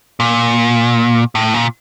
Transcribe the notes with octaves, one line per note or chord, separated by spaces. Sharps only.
A#2
A2
A#2